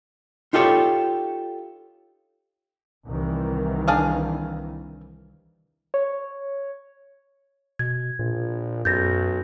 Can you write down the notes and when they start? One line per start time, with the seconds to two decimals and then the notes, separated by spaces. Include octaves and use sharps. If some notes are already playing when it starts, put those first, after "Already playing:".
0.53 D#4 F4 G4 A4 C#5
3.05 C2 D#3 E3
3.88 D4 G#4 F5
5.94 C#5
7.79 B2 G#6
8.19 A#1 A#2
8.85 B1 F#2 G6 A6 A#6